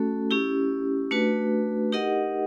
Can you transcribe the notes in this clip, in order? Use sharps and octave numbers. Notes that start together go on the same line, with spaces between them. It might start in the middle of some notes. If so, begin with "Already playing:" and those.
Already playing: A3 C#4 F#4 A4
C#4 E4 G4
A3 D4 F#4 B4
D#4 G4 A#4 D#5 F#5